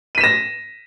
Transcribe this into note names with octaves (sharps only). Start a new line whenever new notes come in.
A#6 B6 D#7 E7